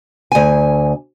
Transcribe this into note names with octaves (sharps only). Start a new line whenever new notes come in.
D2 G#5